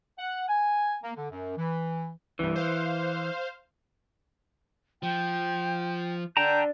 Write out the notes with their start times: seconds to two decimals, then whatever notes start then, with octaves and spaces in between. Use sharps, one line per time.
0.19 F#5
0.49 G#5
1.03 A#3
1.16 D3
1.31 F#2
1.57 E3
2.39 C2 G2 E3
2.56 C5 F5
5.03 F3 G5
6.37 D3 G5 A5 A#5 G6